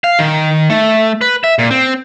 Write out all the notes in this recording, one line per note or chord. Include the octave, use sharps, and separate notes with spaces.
F5
D#3
A3
B4
E5
A#2
C4